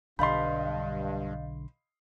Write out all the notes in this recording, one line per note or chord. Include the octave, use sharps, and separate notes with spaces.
B1 G2 D3 D#5 F5 B5 C6 G6